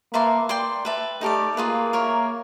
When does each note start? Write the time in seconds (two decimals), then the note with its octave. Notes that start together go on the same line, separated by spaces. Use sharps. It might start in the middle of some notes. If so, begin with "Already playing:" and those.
0.14 A#3 B4 E5 A5 C6
0.49 D5 G5 C6
0.85 B4 E5 A5
1.21 A3 D#4 G4 A#4 D5
1.56 A#3 F4 G#4 B4
1.93 A#4 C#5 E5